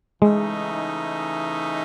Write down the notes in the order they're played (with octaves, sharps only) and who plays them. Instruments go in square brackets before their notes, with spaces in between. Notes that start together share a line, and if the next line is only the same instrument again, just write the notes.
[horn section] C#3 E3 A3 D#4 [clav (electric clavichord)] G#3